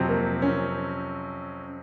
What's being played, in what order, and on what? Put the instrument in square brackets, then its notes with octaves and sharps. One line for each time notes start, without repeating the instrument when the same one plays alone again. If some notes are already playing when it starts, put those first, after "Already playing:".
Already playing: [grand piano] F2 C3 F#3 C4
[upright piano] A#3
C#4